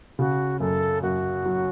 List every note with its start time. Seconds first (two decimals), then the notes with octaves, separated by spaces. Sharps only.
0.19 C#3 F#4
0.60 F#2 A4
1.03 F#2 F#4
1.45 F#3